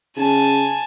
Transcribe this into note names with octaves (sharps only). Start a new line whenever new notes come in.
C#3 G#5 A5